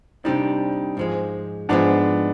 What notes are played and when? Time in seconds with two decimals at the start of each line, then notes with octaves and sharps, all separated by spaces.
0.24 C3 G3 C4 D4 D#4
0.97 G#2 F3 G#3
1.69 G#2 F3 G#3 B3 D4